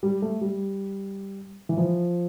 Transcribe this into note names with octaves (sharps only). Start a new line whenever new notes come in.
G3
A3
G3
E3
F3